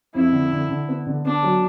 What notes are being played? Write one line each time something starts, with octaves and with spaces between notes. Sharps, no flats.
F2 E4
D3
D3
D3
B3
D3
B3 D4
F#3